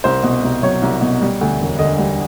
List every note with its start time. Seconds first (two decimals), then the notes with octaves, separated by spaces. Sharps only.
0.04 C2 C5
0.23 B2
0.43 C2
0.63 F#3 C#5
0.82 C2
1.01 B2
1.21 G3
1.41 D2
1.60 E1
1.79 D3 D#5
1.98 G3